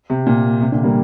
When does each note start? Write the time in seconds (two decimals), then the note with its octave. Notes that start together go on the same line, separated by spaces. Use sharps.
0.10 C3
0.26 A#2
0.61 C3
0.72 A#2 D3
0.84 G3 A#3